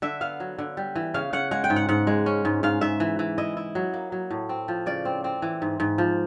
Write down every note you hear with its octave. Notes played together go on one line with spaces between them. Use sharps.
D3 E5
B3 F5
F#3
D3
G3
E3
C#3 F5
C#3 F#5
G#3 F#5
G5
G#2
F#5
G#2 F#5
G#3
C#4
G#2
G#2 F5
G#2 E5
E3
E3
E4 D#5
E4
F#3
A#3
F#3
A2
C4
F3
C#3 D5
C4
C4
E3
G#2
G#2
F3